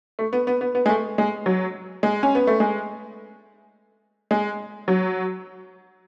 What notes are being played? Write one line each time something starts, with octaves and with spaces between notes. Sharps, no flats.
A3
B3
B3
B3
B3
G#3
A3
G#3
F#3
G#3
C#4
B3
A3
G#3
G#3
F#3